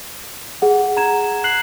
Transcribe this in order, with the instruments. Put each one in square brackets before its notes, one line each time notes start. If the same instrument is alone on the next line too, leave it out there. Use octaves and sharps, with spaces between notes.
[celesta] G#4 F#5
[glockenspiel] A#5 G#6 E7
F#6 C7 F#7